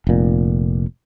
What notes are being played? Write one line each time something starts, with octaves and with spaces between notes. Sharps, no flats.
F1 A#2